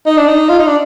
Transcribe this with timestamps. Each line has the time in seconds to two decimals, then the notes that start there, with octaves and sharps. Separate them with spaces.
0.07 D#4
0.17 D4
0.28 D#4
0.49 F4
0.58 D#4
0.67 D4